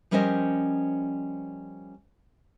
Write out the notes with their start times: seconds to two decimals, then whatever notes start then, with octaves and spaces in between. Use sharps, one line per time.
0.11 F3 G3 C#4 A#4 C5 D#5